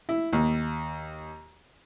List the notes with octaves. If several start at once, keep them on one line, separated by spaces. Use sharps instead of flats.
E4
D#2